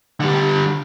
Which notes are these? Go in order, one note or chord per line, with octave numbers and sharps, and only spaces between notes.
D3 G3